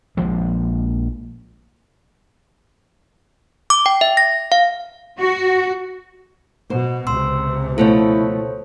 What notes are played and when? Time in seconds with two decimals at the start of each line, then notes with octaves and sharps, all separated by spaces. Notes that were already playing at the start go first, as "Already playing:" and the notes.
0.17 A#1 F3 G#3
3.70 D6
3.86 G5
4.01 E5
4.17 A#6
4.52 F5
5.20 F#4
6.70 B2 C5
7.07 C#2 C3 C6 E6
7.78 B2 F3 A3 E4 A4 C5 C#5